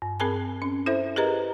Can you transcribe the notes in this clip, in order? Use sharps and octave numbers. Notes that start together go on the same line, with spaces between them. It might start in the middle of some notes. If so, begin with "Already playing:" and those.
G2
C4 G#4 A#4 G#5 A5
C#4
E4 A4 C5 E5
G4 G#4 A#4 B4 D#5 A#5